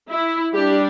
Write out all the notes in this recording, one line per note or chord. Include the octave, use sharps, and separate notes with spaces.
E4
G3 D4 G4